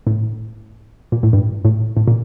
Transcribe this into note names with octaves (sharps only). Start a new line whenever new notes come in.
A2
A#2
A2
G2
A2
A2
A#2